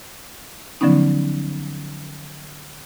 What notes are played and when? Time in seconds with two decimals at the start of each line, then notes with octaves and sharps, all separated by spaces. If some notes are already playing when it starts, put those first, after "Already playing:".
0.81 D3 F3 F#3 B3 C#4 D#4